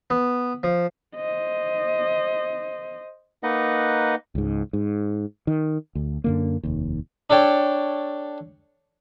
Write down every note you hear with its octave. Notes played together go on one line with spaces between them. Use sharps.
B3
F3
C5 D#5
A#3 D#4 B4 D#5 F#5
C#2 G#2
G#2
D#3
D2
F#2 D3 A#3
F1 D#2
D4 A4 C#5 G5